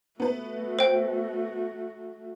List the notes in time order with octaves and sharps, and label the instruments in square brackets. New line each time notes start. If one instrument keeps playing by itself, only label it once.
[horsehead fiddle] A3 F#4 [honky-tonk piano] B3 B4
[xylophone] C5 G5